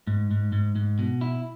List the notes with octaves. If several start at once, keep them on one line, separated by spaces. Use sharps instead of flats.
G#2
G#2
G#2
G#2
B2
E4